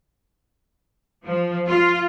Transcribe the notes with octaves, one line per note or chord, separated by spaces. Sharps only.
F3
F4